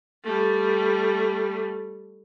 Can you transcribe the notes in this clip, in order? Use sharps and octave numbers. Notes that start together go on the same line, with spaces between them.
G3 A3